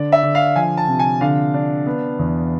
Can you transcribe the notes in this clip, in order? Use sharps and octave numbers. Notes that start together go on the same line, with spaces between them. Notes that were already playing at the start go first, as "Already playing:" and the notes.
Already playing: D3 D5
E5
D3
F5
F3 G#5
A5
C3
G#5
D3 F5
D4
B3
E2